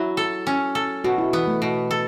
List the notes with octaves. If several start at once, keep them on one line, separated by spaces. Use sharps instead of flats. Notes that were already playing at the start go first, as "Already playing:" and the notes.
Already playing: F#3 E4
A4
C#4
A4
B2 F#4
E4
E3 B3
A3
B2
A4